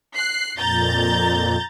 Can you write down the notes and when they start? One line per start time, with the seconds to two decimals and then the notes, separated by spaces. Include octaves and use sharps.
0.15 F#6 C7
0.57 F2 A#2 A#5 G6 A6